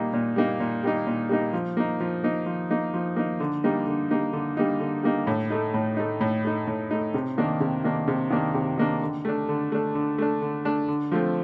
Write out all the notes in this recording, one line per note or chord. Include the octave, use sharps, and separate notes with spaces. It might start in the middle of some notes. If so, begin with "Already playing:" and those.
Already playing: A#2 G3 A#3 D#4
A#2
G3 A#3 D#4
A#2
G3 A#3 D#4
A#2
G3 A#3 D#4
F3
A#3 D#4
F3
A#3 D#4
F3
A#3 D#4
F3
A#3 D#4
D3
G3 A#3 D#4
D3
G3 A#3 D#4
D3
G3 A#3 D#4
D3
G3 A#3 D#4
A2
A3 D#4
A2
A3 D#4
A2
A3 D#4
A2
A3 D#4
C3
D#3 A#3 D4
C3
D#3 A#3 D4
C3
D#3 A#3 D4
C3
D#3 A#3 D4
D3
A3 D4
D3
A3 D4
D3
A3 D4
D3
A3 D4
D3
F3 A3 C4